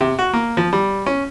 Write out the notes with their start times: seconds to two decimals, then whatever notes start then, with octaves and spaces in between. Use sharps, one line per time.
0.01 C3
0.19 F#4
0.33 A#3
0.57 F3
0.73 G3
1.06 C#4